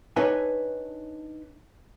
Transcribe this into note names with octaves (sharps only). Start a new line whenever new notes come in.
D4 D#4 B4 C#5 E5 G#5